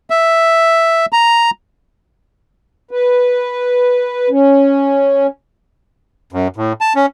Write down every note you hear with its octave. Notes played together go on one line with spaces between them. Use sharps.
E5
A#5
B4
C#4
F#2
A2
A5
C#4